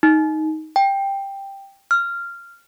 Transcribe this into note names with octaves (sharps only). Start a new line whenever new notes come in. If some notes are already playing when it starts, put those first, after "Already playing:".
D#4
G5
F6